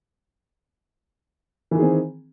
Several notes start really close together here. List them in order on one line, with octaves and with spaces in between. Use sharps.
E3 D#3 G#4 C4